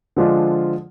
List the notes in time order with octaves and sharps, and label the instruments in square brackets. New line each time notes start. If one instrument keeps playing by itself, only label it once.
[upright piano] D3 F3 G#3 D4 F4